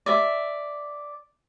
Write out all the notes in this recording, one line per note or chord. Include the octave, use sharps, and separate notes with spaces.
D5 E5